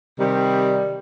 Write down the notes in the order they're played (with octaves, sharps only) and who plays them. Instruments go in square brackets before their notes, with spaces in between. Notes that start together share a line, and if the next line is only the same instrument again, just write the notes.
[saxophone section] C3 D#3 G3